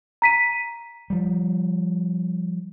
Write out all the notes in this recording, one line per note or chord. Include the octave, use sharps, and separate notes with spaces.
A#5 B6 D#7
F3 G3